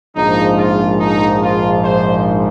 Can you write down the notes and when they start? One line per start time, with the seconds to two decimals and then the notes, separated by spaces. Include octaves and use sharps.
0.16 A#1 G#2 F3 D#4
0.58 F4
1.00 D#4
1.42 F4
1.84 C5